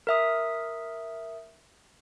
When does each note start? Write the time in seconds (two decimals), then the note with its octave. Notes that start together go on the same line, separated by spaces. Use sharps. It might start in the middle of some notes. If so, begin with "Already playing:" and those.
0.07 A#4 E5 D#6